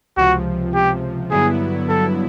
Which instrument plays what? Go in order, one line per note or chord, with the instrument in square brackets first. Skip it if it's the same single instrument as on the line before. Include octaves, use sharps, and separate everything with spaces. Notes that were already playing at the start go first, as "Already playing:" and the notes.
[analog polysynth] C#2 C3 F3 [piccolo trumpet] F#4
[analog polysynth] C#2 C3 F3 [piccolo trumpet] G4
[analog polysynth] G2 D3 F#3 B3 E4 [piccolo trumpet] G#4
[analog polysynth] G2 D3 F#3 B3 E4 [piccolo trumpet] A4